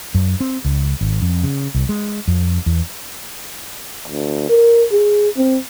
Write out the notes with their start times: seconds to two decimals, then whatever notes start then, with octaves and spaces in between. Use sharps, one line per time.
0.15 F#2
0.40 C4
0.65 C#2
1.01 G#1
1.22 F2
1.44 C#3
1.75 C2
1.89 G#3
2.28 F2
2.66 E2
4.08 D2
4.49 A#4
4.92 G#4
5.37 C4